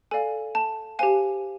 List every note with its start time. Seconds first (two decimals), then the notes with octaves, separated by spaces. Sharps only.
0.11 A4 D5 F5 G#5
0.55 A5
0.99 G4 C5 F5 G#5